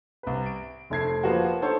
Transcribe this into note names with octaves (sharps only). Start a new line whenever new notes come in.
C2 B4
D7
F1 A3 G#6 C7
F3 A#3 B3 F4 F#4
D4 D#4 A4 C5 C#5